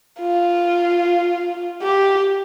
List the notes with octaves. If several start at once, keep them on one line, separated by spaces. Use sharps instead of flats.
F4
G4